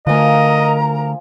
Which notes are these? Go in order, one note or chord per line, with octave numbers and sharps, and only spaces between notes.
D3 F3 A3 A#4 D#5 G#5 A#5